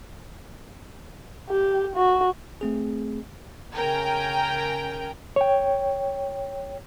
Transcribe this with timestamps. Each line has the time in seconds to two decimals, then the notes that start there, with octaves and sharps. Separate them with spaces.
1.50 G4
1.96 F#4
2.61 A3 C4 G#4
3.76 C#3 A#4 G5 G#5
5.36 C#5 G5